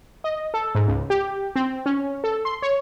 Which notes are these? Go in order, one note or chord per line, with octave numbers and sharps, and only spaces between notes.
D#5
A4
G#2
C#2
G4
C4
C#4
A4
C6
C#5